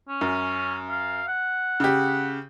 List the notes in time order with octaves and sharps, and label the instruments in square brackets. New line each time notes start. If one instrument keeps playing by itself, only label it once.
[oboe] C#4
[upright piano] F#2
[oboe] F5
F#5
[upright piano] C#3 G4